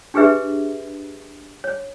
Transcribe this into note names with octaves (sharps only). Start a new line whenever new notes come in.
D4 G4 G#4 B4 E5
C#5